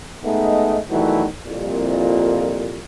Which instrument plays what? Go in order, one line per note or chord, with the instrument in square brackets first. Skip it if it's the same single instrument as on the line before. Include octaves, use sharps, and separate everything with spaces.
[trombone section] G#3 A3 B3 D#4
B1 D#3 E3 F#3 G3 A3
C2 F2 A#2